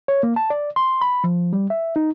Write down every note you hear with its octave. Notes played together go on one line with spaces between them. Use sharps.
C#5
A#3
A5
D5
C6
B5
F3
G3
E5
D#4